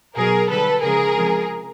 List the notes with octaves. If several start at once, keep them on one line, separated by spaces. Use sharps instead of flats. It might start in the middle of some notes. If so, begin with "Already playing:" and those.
B2 F#3 G#4 A#4
D3 G3 A4 B4
C#3 F3 G#3 G#4 A#4
C3 F3 G#3